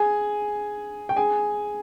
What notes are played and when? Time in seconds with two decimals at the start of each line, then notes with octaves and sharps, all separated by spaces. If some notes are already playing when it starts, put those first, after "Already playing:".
Already playing: G#4 G#5
1.09 G5
1.16 G#4 G#5